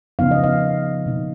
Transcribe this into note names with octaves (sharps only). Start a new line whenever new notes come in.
C#3 F3 B3 D#4 F5
D#5
F5
B2 A#3 D#4